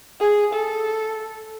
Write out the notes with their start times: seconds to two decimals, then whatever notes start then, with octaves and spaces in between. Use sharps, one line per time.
0.20 G#4
0.54 A4